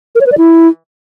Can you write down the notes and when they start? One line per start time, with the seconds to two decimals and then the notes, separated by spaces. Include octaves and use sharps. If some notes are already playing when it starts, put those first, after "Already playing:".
0.15 A#4
0.21 C#5
0.26 B4
0.32 D5
0.38 E4